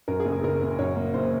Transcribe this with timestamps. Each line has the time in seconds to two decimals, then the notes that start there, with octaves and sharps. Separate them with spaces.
0.08 F#2 A#4
0.20 G#4
0.25 F#1
0.32 G#4
0.43 F#1 A#4
0.62 C#3
0.79 F#2 C#5
0.96 A#3
1.14 F#1 C5